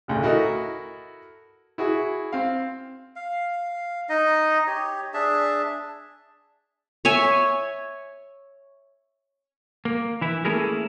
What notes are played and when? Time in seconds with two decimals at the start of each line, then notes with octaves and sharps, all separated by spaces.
0.08 A1 D2 C#3
0.23 E4 F#4 A4 A#4 D#5
1.78 E4 F#4 G#4
2.33 C4 F5
3.16 F5
4.09 D#4 D#5
4.67 G4 C#5
5.14 D4 G#4 E5 A5
7.05 C#5 E5 G#5
9.85 A#3
10.21 E3 E4
10.45 A3 A#3 C#4 E4 G#4 A#4